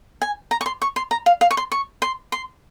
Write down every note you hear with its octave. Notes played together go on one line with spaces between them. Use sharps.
G#5
A#5
C#6
C6
C#6
C6
A#5
F5
F5
C#6
C6
C#6
C6
C6